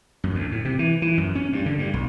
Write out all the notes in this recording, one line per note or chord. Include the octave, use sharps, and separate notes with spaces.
F#2
D2
A2
C3
E3
E3
F#2
C#4
G2
D3
G2
B1